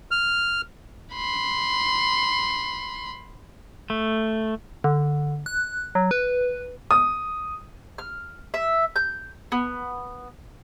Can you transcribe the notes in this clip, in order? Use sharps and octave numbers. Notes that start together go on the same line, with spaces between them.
F6
B5 C6
A3
D3
F#6
F#3
B4
D#6
F6
E5
G6
B3